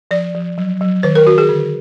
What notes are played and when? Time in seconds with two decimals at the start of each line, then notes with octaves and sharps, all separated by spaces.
0.11 F3 D5
0.34 F3
0.58 F#3
0.81 F#3
1.03 D#3 B4
1.15 A#4
1.26 D#3 F#4
1.38 G#4
1.49 D3